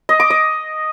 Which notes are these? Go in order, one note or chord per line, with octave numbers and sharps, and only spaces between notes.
D#5
D6
D#5